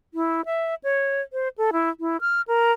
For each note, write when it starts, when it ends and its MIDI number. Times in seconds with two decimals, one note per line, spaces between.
0.14 0.42 64
0.45 0.75 76
0.84 1.22 73
1.33 1.48 72
1.58 1.70 69
1.73 1.90 64
2.00 2.17 64
2.21 2.41 89
2.48 2.72 70